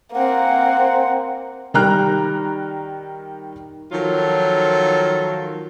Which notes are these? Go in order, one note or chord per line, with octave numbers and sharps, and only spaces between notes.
A#3 C4 F#5
D#3 G3 G5 A#5 F6 F#6
D#3 F3 F#3 F4 A4